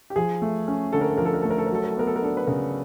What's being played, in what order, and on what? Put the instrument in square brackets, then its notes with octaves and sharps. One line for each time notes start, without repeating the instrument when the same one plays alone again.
[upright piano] G4
[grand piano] F3 [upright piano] G#4
[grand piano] A3
C#4
[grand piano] D3 [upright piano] A4
[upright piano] A#4
A4
[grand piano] F3 [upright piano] A#4
[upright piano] A4
A#4
[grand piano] A3 [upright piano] A4
[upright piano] A#4
A4
A#4
[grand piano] F#3 [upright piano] A4
[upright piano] A#4
A4
[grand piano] B3 [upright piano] A#4
[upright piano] A4
A#4
[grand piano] D4 [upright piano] A4
[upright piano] B4
[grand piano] C#3 [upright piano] A#4